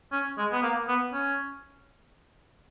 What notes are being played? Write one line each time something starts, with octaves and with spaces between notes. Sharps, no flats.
C#4
G#3
B3
A#3
B3
C#4